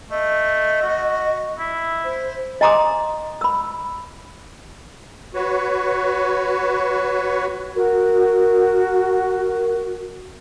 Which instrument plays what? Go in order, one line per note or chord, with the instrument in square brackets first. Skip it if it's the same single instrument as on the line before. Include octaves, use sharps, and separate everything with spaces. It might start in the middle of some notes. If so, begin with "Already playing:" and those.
[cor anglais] A3 [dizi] D#5
[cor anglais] F#4
E4
[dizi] C5
[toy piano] D#5 G#5 A#5 C6 D6 D#6
B5 E6
[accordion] F#4 B4 C#5
[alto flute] F#4 [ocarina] A#4